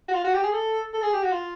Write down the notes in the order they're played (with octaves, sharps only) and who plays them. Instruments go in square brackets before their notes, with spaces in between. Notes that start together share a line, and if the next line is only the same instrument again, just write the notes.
[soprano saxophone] F#4
F4
F#4
G4
G#4
A4
A4
G#4
G4
F#4
F4